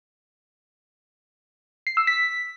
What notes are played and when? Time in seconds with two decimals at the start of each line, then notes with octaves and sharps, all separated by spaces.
1.87 C7
1.97 E6
2.07 B6